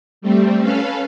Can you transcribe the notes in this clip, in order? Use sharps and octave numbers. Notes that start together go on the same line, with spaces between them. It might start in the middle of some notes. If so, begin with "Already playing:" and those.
G3 A3 C4
C#4 A4 B4 F5